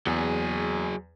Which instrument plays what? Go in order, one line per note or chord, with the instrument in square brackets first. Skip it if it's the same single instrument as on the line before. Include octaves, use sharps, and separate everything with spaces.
[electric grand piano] E2 [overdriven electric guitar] F#3 G#4